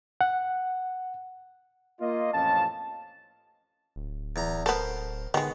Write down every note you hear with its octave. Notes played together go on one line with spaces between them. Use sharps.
F#5
A#3 F4 D#5
A1 F2 C#4 F5 A5
D1
E2 A#5
B3 A4 A#4 C5
D3 D#3 G#3 B3